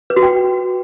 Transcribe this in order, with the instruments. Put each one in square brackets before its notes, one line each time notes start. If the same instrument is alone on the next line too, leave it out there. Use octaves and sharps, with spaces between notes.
[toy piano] B4
F#4
G5